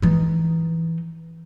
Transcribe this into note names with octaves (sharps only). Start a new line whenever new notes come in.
E3 D#4